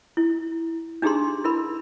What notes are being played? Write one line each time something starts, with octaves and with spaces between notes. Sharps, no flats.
E4
D4 D#4 G4 G#4 A#5 C6
E4 A#4 B5